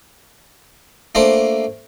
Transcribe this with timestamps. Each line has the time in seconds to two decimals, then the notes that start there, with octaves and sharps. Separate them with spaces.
1.15 A3 A#3 D4 C5